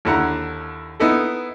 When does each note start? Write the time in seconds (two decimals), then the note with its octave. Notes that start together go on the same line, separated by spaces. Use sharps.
0.05 D#2 D3 E4 F#5 A#5
1.00 B3 D#4 E4 A4